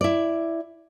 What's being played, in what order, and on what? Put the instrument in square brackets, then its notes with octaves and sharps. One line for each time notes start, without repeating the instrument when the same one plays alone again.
[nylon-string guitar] E4 D5